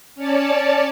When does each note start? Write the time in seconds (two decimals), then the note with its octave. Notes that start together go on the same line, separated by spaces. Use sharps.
0.15 C#4 C#5 D5 A5